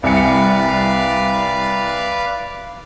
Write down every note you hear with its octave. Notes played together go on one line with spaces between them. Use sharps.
C2 B4 D5 F5 G#5 C#7